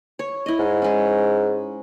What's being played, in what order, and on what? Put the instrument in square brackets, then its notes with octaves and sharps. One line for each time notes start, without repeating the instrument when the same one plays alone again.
[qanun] C#5
E4 D#5
[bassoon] G#2
[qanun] G#3 C#4